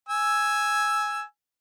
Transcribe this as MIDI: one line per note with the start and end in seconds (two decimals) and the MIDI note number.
0.09 1.22 80
0.09 1.22 88